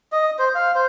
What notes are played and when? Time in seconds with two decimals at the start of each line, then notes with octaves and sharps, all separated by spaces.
0.12 D#5
0.39 C5
0.55 F5
0.75 C5